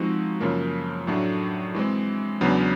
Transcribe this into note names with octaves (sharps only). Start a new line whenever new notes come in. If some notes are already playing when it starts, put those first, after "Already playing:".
Already playing: F3 G#3 C4 D#4 F#4
F#2 C#3 F3 A#3
A2 F#3 A3 D4 F#4
E3 G#3 C4
E2 C#3 F#3 B3 D4